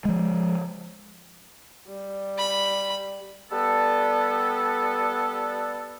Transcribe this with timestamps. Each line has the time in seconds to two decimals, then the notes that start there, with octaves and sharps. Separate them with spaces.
0.05 F3 G#3
1.88 G3
2.38 B5
3.51 G3 B3 A4